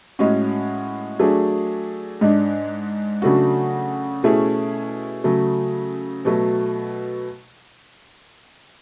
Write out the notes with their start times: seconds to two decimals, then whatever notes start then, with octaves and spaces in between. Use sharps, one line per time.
0.19 A2 G#3 C#4 F#4
1.19 F#3 A3 D4 G#4
2.21 G#2 G#3 D4
3.22 C#3 F#3 A3 D4 F#4
4.23 B2 A3 C#4 E4 G#4
5.24 C#3 F#3 A3
6.25 B2 F#3 A3